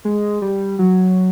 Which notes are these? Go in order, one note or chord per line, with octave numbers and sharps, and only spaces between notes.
G#3
G3
F#3